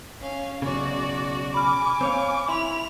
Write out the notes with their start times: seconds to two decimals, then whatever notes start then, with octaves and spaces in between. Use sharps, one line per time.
0.20 C#4 F5
0.62 B1 C#3 F#4 D5
1.54 G#5 B5 D6 F6
2.01 C4 C#5 F5
2.49 E4 B5 C6 F7